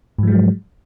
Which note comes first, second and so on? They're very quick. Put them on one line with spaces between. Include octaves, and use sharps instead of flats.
G#2 F3 G#3 F#3